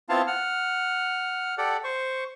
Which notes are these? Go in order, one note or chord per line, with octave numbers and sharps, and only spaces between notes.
B3 C4 E4 F4 F5 A5
F#5 F6
G4 A4 D5 F#5
C5 C#6